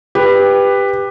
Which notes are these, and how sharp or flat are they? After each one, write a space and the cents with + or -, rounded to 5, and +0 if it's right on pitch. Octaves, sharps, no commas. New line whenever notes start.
G4 +15 B4 +0